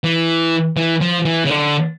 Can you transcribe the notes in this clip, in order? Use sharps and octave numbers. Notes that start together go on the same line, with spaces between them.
E3
E3
F3
E3
C#3
D3